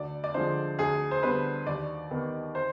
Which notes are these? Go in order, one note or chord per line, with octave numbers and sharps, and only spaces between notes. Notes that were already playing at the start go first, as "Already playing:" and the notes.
Already playing: D2 D5
D5
D3 F3 G#3 C5
D2 G#4
C5
D3 G3 B3 B4
D#2 D5
D#3 B3
C5